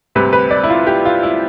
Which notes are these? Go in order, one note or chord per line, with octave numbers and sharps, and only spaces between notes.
D2 C3 G3 B4
B4
D5
E4
F4
G4
F4
E4